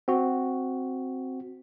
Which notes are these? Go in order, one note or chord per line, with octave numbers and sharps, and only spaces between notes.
C4 F#4